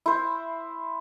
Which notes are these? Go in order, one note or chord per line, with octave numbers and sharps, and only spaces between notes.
E4 C5